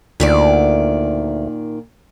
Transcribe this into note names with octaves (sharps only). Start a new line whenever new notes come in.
D2 A#2 D#3 D5